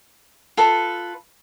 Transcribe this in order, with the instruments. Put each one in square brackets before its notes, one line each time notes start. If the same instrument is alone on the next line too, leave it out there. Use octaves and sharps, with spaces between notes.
[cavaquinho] F4 A4 B4